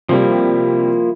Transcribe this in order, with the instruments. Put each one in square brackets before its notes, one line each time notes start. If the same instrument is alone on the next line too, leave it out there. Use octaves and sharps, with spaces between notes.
[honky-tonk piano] C3 G3 [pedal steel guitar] F3 A#3 E4